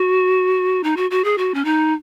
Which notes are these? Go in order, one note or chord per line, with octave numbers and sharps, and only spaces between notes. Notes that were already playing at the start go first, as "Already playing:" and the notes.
Already playing: F#4
D#4
F#4
F#4
G#4
F#4
C#4
D#4